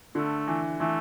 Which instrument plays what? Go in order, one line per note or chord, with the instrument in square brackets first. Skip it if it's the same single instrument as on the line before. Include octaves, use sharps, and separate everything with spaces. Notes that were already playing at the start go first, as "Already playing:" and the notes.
[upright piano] D3 [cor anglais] A3
[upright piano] E3
[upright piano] E3 [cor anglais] A3